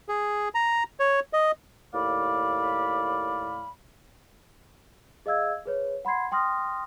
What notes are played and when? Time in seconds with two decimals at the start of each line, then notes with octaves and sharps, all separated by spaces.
0.09 G#4
0.55 A#5
0.99 C#5
1.33 D#5
1.94 D#2 A2 D5 F5 B5
5.26 G#4 D#5 F5 E6 G#6
5.65 G#4 B4 C#5
6.05 F#5 B5 C6 G#6 C7
6.32 G5 C6 D#6 F6 A#6